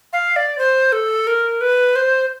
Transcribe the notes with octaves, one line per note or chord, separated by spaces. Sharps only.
F5
D5
C5
A4
A#4
B4
C5